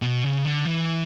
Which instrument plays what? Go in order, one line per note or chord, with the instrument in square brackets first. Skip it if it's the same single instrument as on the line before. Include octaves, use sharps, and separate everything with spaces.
[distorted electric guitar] B2
C#3
D3
E3